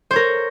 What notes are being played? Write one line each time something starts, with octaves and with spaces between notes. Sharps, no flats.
A#4 C5 C#5